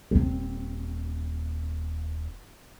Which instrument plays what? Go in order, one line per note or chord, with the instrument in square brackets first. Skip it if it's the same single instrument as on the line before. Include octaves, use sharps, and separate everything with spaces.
[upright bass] D#1 C4